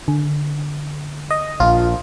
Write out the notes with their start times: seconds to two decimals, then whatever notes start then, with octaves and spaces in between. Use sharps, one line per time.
0.08 D3
1.31 D#5
1.60 A#1 F4